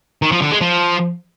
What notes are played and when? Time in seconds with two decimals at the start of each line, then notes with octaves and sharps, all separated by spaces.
0.22 D#3
0.32 F3
0.42 D3
0.52 G#3
0.61 F3